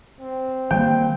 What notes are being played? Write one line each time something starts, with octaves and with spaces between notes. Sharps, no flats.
C4
D#3 G3 A#3 G5